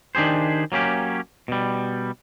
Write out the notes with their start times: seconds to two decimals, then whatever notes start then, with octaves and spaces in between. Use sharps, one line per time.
0.15 D#3 D4 G4 G#4 C5
0.72 F#3 A#3 C#4 G4
1.48 B2 G3